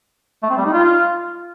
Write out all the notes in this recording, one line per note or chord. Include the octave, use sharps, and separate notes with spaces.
A3
C4
G3
D#4
F4